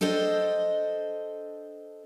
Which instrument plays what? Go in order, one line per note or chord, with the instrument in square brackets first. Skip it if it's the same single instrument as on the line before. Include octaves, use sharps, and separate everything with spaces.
[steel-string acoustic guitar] D4 A4 C5 D#5 G5